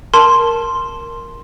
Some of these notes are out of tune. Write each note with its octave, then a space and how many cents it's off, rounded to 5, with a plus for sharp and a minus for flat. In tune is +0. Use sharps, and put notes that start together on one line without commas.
A#4 +0 A5 +0 C6 +0